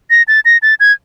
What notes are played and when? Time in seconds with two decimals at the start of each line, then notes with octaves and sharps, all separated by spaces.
0.10 A#6
0.28 A6
0.45 A#6
0.62 A6
0.80 G#6